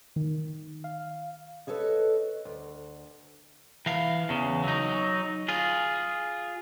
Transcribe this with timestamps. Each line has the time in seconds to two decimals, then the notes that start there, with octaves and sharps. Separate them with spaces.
0.16 D#3
0.84 F5
1.67 A4 B4 C#5 D#5
2.45 D2
3.86 E3 F5
4.29 E2 C#3
4.64 F#3 D#4
5.48 F4 G#4